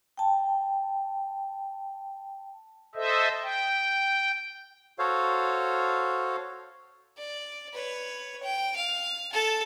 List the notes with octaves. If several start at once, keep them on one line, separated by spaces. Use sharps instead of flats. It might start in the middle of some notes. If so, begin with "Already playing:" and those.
G5 A5
A4 C5 D#5 E5
G5
F#4 A4 C5 C#5 F5
D5
B4 C#5
G5
F5
A4 A5